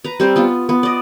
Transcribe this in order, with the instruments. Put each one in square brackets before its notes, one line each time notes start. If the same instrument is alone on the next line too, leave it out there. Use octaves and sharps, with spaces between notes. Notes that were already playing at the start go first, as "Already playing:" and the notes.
[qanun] B4 A#5
G3 C4 C5 C6
B3 F4
B3
D5 D#5